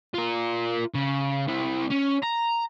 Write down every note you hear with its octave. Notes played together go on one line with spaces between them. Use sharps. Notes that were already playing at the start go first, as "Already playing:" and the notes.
F4 A#4
C#3
C3 E4
C#4
A#5